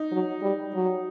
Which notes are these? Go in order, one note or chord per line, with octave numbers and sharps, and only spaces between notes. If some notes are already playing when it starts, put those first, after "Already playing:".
Already playing: D#4
F#3
G3
F#3